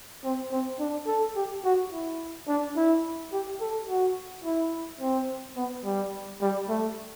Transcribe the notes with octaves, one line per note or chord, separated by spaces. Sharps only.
C4
C4
D4
A4
G4
F#4
E4
D4
E4
G4
A4
F#4
E4
C4
B3
G3
G3
A3